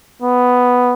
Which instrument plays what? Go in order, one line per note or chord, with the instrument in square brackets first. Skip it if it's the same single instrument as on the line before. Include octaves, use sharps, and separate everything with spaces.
[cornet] B3